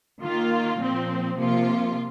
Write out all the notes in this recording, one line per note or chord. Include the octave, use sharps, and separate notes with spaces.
D#3 A#3 F4
A#2 F3 C4
C3 F3 A#3 F4